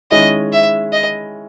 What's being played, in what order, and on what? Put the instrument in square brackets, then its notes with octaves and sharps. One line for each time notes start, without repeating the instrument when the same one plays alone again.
[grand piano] D#3 G#3 C#4 E4 [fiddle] D#5
[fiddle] E5
D#5